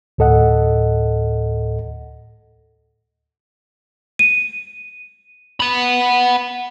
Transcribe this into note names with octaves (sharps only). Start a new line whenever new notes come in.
D2 A2 A4 D#5 F#5
D#7
F#5 B5